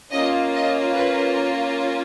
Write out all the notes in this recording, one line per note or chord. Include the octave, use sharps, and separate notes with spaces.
A#3 C#4 F4 D#5
D#5
B4